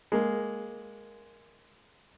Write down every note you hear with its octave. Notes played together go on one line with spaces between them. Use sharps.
G#3 A#3